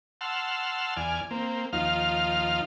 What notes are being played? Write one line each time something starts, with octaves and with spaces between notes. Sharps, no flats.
F#5 A5 C6 E6 F6
E2 D5 G#5 F6
A#3 C4
D#2 F3 D#4 F4 F5 F6